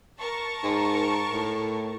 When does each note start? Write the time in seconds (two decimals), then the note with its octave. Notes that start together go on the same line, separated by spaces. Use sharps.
0.20 A#4 A5 C#6
0.64 G#2
1.32 A2